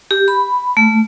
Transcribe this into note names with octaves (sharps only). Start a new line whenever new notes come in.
G4
B5
A3